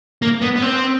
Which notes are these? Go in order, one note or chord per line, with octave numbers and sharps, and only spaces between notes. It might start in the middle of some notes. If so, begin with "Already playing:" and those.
A#3
B3
B3
C4